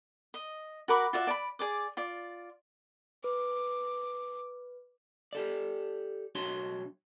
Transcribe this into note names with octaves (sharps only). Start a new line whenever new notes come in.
D#5
F#4 A#4 B5 D6
F4 F#4 D5 E5
D5 A5 B5
G#4 D5 D6
F4 D5
B4 D6
G4 A4 D5
B1 D4 F#4 C#5 C6